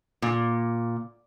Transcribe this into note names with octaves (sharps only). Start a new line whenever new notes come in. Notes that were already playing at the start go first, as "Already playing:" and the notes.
A#2